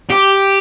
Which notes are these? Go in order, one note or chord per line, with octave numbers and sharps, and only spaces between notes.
G4